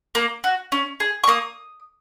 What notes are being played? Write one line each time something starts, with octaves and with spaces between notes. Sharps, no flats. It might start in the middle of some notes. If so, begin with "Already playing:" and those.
A#3
F#4
C#4
G#4
C#6
A#3 D#6